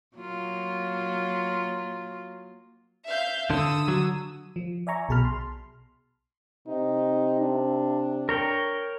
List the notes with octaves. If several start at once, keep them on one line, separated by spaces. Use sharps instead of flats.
F#3 A#3 F4
E5 F5 G6
D3 D#6 E6
D3 F#3
F3
D5 E5 G#5 A#5 C#6
B1 B2 G#4 A5 B5 F6
C6
C3 D#4
D4
A#4 C#5 G5